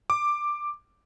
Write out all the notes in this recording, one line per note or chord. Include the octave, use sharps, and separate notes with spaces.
D6